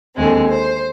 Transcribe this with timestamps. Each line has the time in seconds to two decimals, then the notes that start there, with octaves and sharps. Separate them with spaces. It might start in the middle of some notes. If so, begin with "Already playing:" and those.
0.16 D#2 D3 G#3 C4
0.49 C5